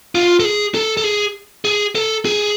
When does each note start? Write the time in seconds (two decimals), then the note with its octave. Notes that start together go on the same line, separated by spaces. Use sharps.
0.15 F4
0.40 A4
0.44 G#4
0.75 A4
0.97 A4
1.04 G#4
1.65 G#4
1.95 A4
2.25 G#4